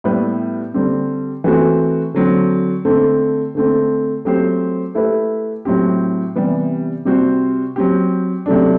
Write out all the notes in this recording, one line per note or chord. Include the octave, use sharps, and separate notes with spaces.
A2 G3 B3 E4 B4
D3 G3 C4
E3 A3 C4 F#4
D3 F#3 C4 F#4
D3 A3 C4
D3 A3 C4
F#3 A3 C4 G4 C5
A3 E4 G4 B4
A2 F#3 C4 G4
C3 E3 G3 B3
C3 G3 C4 F#4 C5
F#3 C4 G4
C3 F#3 A3 D4